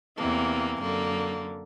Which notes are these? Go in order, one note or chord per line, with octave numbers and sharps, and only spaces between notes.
E2 C3 E3 A#3
F#2 D3 A#3